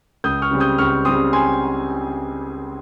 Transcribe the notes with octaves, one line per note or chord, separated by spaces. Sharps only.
C#2 D#6 G6
C#6 F6
C#3 G3 C4
D#6 G6
C#2 C#6 F6
C#3 G3 C4 C6 D#6
G#5 C6